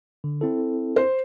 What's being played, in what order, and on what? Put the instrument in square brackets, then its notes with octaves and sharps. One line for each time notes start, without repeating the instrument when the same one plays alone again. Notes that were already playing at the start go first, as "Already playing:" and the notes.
[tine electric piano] D3
C4 E4 A4
[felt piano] C5